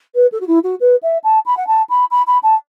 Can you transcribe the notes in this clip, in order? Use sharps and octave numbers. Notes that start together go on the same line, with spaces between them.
B4
A4
F#4
E4
F#4
B4
E5
A5
B5
F#5
A5
B5
B5
B5
A5